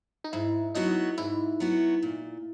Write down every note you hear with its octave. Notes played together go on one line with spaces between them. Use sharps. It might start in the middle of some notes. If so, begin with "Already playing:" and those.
D#4
G#2 E4
F#3 B3 D#4 F#4
G#2 E4
F#3 B3 F#4
A#2